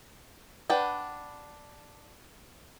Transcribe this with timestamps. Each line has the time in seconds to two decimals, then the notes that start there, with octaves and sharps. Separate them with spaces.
0.70 D4 B4 F#5 G5